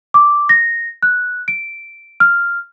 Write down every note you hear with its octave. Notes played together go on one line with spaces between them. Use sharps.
D6
A#6
F#6
D7
F6